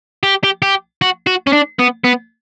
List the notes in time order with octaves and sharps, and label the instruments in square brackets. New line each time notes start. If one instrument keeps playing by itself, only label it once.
[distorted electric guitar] G4
G4
G4
F#4
F#4
C#4
D4
B3
B3